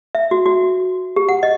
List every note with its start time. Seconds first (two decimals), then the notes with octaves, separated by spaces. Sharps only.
0.15 E5
0.31 F#4
0.46 F#4
1.16 G4
1.29 F#5
1.43 D#5